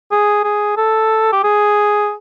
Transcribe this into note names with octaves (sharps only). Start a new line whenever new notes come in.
G#4
G#4
A4
G4
G#4